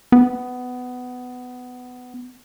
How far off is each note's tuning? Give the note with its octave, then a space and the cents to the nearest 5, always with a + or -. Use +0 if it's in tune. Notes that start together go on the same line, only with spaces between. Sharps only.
B3 +15